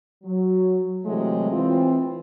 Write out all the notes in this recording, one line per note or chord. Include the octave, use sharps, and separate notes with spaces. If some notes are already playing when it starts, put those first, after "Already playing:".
F#3
C3 E3 F#3 G#3 A3
E3 C4 F4